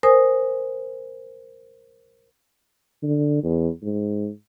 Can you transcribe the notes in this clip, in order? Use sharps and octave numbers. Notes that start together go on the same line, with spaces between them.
A#4 C5 G#5 D#6
D3
E2
G#2